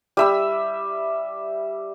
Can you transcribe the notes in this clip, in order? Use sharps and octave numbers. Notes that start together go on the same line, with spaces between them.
G3 E5 E6